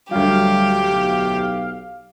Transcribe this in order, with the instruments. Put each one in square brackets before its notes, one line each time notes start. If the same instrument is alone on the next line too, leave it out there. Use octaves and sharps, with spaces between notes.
[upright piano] D2 F#3 [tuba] G3 [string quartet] G4 [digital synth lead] F5
[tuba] B1